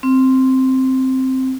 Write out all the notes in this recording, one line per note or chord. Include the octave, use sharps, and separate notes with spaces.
C4